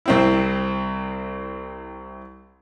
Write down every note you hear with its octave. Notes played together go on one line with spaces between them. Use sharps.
C2 C4 E4